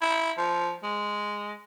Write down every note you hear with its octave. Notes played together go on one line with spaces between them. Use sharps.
E4
F3
G#3